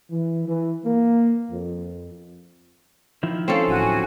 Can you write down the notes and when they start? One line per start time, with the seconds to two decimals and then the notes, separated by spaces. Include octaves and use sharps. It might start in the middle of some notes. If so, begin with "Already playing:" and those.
0.11 E3
0.46 E3
0.84 A#3
1.51 F2
3.23 D#3 F3 E4
3.48 C4 C#4 A4 F5
3.67 D1 F#4 G#5